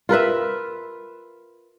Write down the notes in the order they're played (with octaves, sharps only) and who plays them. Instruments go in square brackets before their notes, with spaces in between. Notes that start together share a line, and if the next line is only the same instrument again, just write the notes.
[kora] F4 A#4 B4 E5